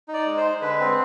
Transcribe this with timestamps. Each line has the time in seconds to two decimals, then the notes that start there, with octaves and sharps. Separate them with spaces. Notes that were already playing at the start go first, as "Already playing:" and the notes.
0.08 D#4
0.14 D5
0.26 G#3
0.37 C5
0.44 G#3
0.62 D3 B4
0.80 C4